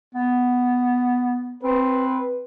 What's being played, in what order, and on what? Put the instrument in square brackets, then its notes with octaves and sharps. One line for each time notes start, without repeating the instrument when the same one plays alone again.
[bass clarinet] B3
[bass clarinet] C4 [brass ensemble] B4